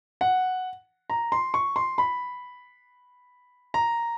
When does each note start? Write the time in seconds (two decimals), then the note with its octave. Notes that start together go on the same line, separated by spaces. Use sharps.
0.21 F#5
1.10 A#5
1.32 C6
1.54 C#6
1.76 C6
1.98 B5
3.74 A#5